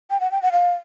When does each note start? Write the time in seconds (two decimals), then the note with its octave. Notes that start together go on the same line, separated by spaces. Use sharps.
0.11 G5
0.20 F#5
0.32 G5
0.42 F#5
0.52 F5